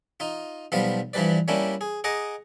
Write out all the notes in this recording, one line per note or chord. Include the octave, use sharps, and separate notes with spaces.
D#4 F4
B1 F3 G3 B3 F4 F5
G2 E3 F3 G3 B4 D5
G3 A#3 C#4 D4 E4 G4
G#4
G#4 D#5 F#5 A#5 D6